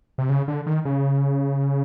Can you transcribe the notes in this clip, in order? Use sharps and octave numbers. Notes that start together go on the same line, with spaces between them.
C3
C#3
D3
D#3
C#3